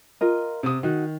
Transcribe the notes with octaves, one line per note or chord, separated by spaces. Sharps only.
F4 A#4 D#5
C3 D#6
D#3 D#4 F#4